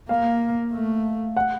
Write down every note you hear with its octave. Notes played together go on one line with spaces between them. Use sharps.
A#3 F5
A3
F#5